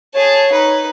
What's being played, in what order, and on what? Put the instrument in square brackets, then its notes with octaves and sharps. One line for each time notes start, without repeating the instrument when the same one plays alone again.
[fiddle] G#4 A5 [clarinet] C#5
[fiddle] D#4 B4